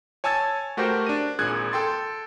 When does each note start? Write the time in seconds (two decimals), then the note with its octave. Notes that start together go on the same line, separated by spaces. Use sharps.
0.24 C#5 G#5 A5 E6 G#6 A6
0.77 A3 F#4 G4 A#4 C5 G5
1.06 D4 D#7
1.39 G#1 A#2 G#4 F#6 G#6
1.72 A4 G5 C6 A6